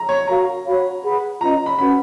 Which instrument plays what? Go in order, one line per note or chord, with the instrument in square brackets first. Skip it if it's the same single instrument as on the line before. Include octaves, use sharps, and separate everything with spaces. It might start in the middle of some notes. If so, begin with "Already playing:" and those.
Already playing: [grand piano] A#5
C#5
[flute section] F#4 A#4 F5 [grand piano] A#5
[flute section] F#4 C#5 F5 B5
G#4 B4 F#5 B5
[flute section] C#4 F4 B4 D#5 [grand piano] A#5
[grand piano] B5
[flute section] C#4 F#4 B4 F#5 [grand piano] B5